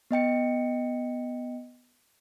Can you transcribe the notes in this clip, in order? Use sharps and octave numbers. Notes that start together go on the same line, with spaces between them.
B3 D#5 G5 C#7